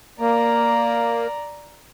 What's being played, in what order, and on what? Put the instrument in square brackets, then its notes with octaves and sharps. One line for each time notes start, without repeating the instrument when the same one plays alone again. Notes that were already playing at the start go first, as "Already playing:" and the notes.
[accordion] A#3 [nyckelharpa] D5 A#5